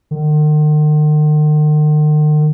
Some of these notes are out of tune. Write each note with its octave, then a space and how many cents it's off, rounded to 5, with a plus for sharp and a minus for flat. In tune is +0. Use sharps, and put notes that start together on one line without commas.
D#3 -45